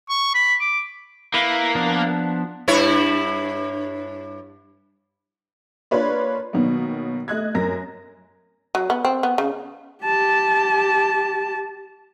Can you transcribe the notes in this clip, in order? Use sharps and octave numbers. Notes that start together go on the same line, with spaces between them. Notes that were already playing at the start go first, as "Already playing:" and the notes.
C#6
B5
D6
A#3 E4 B4
F3 B3 D4
G2 E4 C#5
A#3 D4 F4 B4 C#5 D5
B2 D#3 F#3 A#3 B3
A3 D#5 F#6 G#6
F#2 A#4 A#6
F#3
B3
C4
B3
C#3
G4 A5